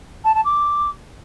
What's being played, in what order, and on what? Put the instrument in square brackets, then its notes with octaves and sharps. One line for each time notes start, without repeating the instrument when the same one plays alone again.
[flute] A5
A5
D6